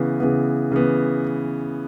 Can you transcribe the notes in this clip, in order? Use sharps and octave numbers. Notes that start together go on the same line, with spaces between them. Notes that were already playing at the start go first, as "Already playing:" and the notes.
Already playing: C#3 E3 B3
C#3 E3 B3
C#3 E3 B3